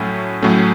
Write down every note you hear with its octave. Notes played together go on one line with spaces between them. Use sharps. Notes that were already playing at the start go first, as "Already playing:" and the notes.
Already playing: A2 F#3 A3 C#4
A2 F#3 A3 C#4